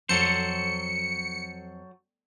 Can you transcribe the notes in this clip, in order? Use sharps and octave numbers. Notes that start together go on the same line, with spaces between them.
F2 F#3 A4 C5 C#7